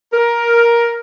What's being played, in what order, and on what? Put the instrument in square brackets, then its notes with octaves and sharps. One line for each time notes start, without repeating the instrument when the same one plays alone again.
[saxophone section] A#4